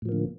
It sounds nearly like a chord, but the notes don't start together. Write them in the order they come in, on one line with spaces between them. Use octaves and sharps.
A2 F3 A#3 D3